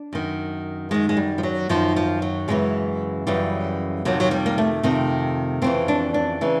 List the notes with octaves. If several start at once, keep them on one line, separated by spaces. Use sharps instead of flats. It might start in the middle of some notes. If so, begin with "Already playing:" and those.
Already playing: D4
F#2 D#3
F#2 D#3 G#3
G#3
G3
F3
F#3
F#2 D#3 F3
F3
F#3
F#2 C#3 E3 G#3
F#2 C#3 E3 G3
F2 C3 D#3 F#3
F#3
G3
A#3
A3
F2 C3 D#3
F2 C#3 E3 C4
D4
D4
C#3 E3